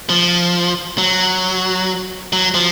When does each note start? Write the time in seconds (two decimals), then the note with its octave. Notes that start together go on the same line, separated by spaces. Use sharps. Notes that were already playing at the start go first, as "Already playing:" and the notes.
0.09 F3
0.98 F#3
2.33 F#3
2.55 F3